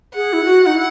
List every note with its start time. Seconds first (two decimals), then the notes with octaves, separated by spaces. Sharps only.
0.15 G#4 F#5
0.33 E4
0.45 F#4
0.66 D#4
0.75 E4